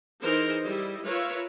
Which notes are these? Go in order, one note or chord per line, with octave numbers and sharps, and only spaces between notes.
E3 D#4 G#4 A#4 C5
G3 E4 D#5
F4 A#4 B4 C#5 E5 F5